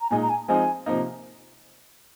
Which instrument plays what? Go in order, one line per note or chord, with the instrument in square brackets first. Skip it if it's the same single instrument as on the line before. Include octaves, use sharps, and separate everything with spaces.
[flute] A#5
[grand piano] A#2 G#3 D#4 [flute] G#5
[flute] A#5
G#5
[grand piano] F3 G#3 C4 D#4 [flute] G#5
[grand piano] C3 F3 A#3 D#4